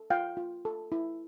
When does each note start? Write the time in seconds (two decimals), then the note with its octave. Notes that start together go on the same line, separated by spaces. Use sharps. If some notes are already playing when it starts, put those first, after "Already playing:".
Already playing: A4
0.10 F4 F5 G5
0.37 F4
0.65 A4
0.92 E4